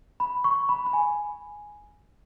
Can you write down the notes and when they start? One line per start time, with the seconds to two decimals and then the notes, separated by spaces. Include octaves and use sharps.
0.20 B5
0.44 C#6
0.69 B5
0.86 B5
0.93 G#5